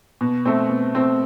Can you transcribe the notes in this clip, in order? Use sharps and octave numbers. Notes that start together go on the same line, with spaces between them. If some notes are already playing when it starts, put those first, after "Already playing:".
B2
A3 C4
B2
A3 C4